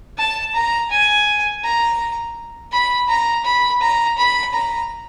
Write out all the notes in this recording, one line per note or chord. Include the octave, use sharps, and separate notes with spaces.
A5
A#5
G#5
A#5
B5
A#5
B5
A#5
B5
A#5